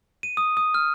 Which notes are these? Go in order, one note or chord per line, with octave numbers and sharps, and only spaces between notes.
D#7
D#6
D#6
F6